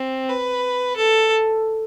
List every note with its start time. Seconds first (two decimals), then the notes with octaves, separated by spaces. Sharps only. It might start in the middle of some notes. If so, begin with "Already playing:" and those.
Already playing: C4
0.29 B4
0.96 A4